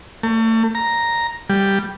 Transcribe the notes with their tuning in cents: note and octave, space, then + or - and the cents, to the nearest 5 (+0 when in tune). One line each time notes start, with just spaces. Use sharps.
A3 +40
A#5 +0
G3 +5